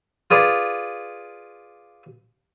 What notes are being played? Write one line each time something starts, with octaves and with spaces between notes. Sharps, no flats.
F4 G#4 B4 D5